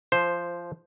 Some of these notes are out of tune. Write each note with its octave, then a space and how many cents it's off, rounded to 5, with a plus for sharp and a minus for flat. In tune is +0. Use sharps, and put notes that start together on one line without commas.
F3 -20 C5 +0